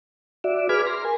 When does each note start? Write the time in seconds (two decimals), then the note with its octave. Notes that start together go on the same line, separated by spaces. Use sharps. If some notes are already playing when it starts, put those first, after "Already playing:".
0.44 F#4 D5 E5
0.69 G#4 B4 G#5 B5 D6 F6
0.87 A#5 C6
1.05 A#4 G#5